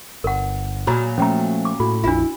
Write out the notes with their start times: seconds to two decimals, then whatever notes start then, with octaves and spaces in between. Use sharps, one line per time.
0.24 G1 A#4 F#5
0.87 A#2 F#3 F#4 G#4 C#5 A#5
1.18 F3 G3 A3 C#4 G5 A#5
1.65 D6
1.80 A2 F#4
2.04 A#1 F2 D4 E4 F4